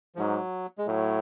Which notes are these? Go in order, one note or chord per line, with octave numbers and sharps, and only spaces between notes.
F3
G#2 F#3
G#3
A2 F#3